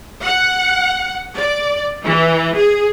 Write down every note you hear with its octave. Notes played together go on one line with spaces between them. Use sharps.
F#5
D5
E3
G#4